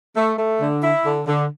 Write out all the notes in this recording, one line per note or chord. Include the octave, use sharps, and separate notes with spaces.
A3
A3
D3
E4
D3
D3